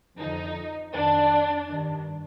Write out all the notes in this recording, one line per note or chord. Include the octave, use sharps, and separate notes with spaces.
F2 D3 F3 D#4
F2 D#3 D4
G2 D#3